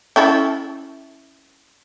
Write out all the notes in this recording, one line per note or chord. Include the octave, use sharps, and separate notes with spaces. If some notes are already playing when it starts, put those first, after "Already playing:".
C#4 E4 A4